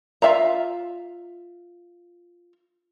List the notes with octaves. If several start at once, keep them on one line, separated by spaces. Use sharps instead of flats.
F4 A4 E5 F5 A#5